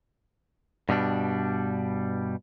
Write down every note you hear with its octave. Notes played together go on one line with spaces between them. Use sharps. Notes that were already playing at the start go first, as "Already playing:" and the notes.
G2 B2 G3 D4